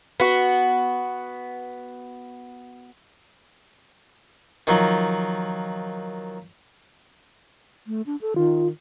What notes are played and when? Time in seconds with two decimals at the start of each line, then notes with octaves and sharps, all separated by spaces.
0.20 B3 F#4
4.67 D#3 F3 F#3
7.87 A3
8.06 D4
8.22 A4
8.36 D#3 F4